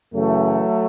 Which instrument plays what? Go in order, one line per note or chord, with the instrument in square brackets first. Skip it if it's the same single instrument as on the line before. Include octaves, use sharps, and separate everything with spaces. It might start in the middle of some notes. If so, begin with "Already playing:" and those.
[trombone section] F#2 C#3 E3 F#3 A3